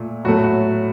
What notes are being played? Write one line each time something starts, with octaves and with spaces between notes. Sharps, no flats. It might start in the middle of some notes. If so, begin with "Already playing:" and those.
Already playing: A#2 A3
A2 F#3 A3 F#4
F#4